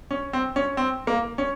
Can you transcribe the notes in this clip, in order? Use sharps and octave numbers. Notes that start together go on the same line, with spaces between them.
C#4
C4
C#4
C4
A#3
C#4